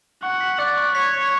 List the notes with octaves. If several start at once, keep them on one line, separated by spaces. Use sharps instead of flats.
F#5 C#6
B6
D5 F#6
C#6
C#5 B6
C#6